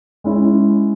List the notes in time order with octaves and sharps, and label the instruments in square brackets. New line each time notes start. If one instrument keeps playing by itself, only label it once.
[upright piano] G#3 C#4 E4